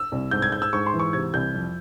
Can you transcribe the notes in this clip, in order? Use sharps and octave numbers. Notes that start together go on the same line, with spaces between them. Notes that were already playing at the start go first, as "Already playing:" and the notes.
Already playing: E6
C2
G#2 G6
G#6
G#2 G6
E6
G#2 C#6
C6
E3
C#6
C3 G#6
C2 G6
F2